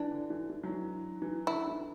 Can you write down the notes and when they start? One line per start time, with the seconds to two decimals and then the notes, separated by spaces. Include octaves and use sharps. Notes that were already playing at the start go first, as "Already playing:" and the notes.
Already playing: E3 D4
0.12 D3
0.30 E3
0.50 E3
0.64 F#3
0.69 E3
1.22 E3
1.47 D3 E4
1.67 E3